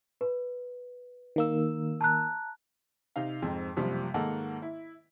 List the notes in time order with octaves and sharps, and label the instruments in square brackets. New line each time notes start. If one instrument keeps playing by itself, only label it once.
[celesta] B4
[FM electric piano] D#3 A#3 E6
[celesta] A5 A#5 F#6
[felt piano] C3 D#4 F5
F2 G#2 C4
F#1 C3 F3 G3
G#2 D#3 A#3 A4 F#5 A5
E4